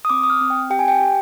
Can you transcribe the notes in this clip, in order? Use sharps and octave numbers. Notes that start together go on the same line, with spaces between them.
D#6
C4 D6
D#6
F6
C4
G5
G4 G5
G#5
G5
G4